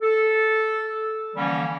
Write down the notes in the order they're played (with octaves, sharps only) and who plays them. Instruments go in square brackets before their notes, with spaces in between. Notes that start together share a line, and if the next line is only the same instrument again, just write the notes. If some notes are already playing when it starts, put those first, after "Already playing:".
[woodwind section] A4
D3 E3 F3 G3 A#3 C#4